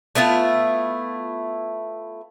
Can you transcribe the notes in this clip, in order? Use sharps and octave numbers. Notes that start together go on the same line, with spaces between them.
A3 B3 E4 F4